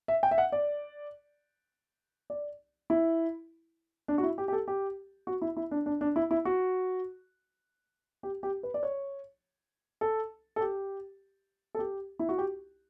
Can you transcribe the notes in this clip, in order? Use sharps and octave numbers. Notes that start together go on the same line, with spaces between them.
E5
G5
E5
F#5
D5
D5
E4
D4
F#4
E4
G4
G4
A4
G4
F#4
E4
E4
D4
D4
D4
E4
E4
F#4
G4
G4
B4
D5
C#5
A4
A4
G4
A4
G4
E4
F#4
G4